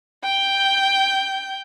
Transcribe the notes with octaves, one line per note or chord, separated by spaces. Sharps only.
G5 G6